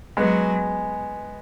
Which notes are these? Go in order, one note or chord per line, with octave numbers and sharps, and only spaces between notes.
F#3 G#3 B3